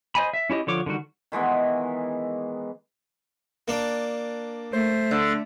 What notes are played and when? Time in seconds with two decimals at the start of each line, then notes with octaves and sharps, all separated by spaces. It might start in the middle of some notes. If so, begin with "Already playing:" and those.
0.15 C5 D#5 G#5 B5
0.34 E5
0.50 C#4 E4 G4 D#5
0.67 D3 F3 C#5 D6
0.86 D3 D#3 G3 F#4
1.32 D#3 E3 G#3 B3
3.68 A#3 D4
4.73 A3 C5
5.11 D3